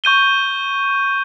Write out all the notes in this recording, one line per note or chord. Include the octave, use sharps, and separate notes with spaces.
C#6 G6 D#7 G7